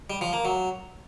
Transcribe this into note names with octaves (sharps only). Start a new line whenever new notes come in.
G3
F3
A#3
F#3